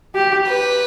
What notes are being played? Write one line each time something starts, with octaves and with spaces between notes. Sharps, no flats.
G4
B4